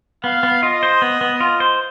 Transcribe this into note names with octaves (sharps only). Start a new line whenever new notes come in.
B3 F5
B3
F4 D#5
C5
B3
B3
F4
C5